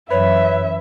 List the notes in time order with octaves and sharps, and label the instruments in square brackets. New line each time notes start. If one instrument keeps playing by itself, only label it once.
[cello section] F#2 E3 [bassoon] B4 [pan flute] C#5 [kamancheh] E5